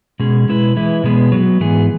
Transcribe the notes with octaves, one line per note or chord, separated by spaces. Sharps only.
B2 G#3 C#4 G#4
B2 G#3 E4 B4
E3 G#3 E4 B4
B2 G#3 B3 G#4 B4
F#3 B3 F#4
G#2 E3 B3 G#4